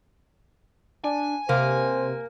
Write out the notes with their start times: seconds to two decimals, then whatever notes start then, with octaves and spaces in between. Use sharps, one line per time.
1.04 D4 G#5
1.49 C3 A#3 C5